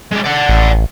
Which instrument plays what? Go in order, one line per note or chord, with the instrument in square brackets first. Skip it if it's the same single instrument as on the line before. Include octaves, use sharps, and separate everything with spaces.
[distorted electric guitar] G#3 D5
D5 F#5
[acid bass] A1